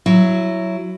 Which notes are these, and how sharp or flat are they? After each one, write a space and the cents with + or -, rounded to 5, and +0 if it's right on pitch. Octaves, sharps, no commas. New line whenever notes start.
F#3 +0 E4 +10